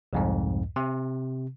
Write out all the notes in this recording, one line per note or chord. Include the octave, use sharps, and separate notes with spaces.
C2 F2 G#2
C3